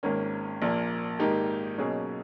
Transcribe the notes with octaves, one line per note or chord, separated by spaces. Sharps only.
G#1 G#2 D#3 A#3 C#4
A#1 A#2 A#3
G#2 D#3 A#3 D#4 G4
B1 B2 A#3 C#4 G#4